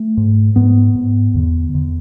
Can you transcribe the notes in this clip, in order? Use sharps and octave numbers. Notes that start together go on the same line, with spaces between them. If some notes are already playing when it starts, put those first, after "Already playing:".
Already playing: A3
G#2
G#2 B3
G#2
E2 D3
E2 D3